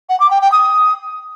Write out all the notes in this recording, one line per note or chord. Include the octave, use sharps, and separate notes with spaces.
F#5
D6
G5
G5
D#6